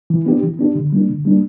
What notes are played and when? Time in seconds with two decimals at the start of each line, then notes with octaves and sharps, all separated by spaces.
0.10 E3
0.26 B3 D4 G4
0.43 E3
0.59 B3 D4 G4
0.75 D3
0.93 G3 A#3 D4
1.09 D3
1.25 G3 A#3 D4